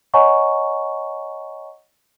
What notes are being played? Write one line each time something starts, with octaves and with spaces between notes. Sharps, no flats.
C#5 D#5 F#5 G#5 A#5 C#6